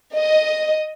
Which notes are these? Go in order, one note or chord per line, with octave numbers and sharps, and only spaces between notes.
D#5